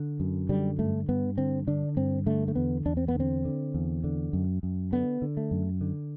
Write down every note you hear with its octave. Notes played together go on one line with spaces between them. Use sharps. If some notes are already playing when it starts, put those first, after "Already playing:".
Already playing: D3
F#2
D3 G3
G2 A3
G2 B3
D3 C4
D3 D4
G2 C4
D3 A3
A3
E2 B3
E2 D4
C4
B3
D3 C4
D3
E2
D3
F#2
F#2
D3 B3
D3
A3
F#2
D3